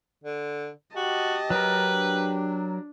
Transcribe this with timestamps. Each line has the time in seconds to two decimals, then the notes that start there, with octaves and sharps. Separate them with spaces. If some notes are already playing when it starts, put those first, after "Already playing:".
0.24 D3
0.96 F#4 G4 D#5 A5
1.50 F#3 A#4 B4
1.95 D4